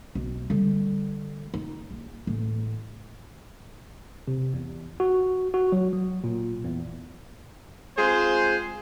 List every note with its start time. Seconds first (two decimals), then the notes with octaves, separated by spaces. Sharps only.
0.15 B1
0.50 D3 G3
1.54 D#4
1.91 A#1
2.27 E2 A2
4.28 C3
4.54 E2
5.00 F#4
5.54 F#4
5.72 F#3
5.93 F#3
6.24 A#2
6.65 E2
7.97 G#3 C4 F4 G#4 C5